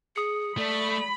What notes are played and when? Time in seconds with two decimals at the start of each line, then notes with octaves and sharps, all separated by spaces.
0.16 G#4 D#6 C#7
0.58 A3 D5 B5